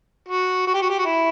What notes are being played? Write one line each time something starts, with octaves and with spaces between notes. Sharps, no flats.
F#4
F#4
G4
F#4
G4
F#4
E4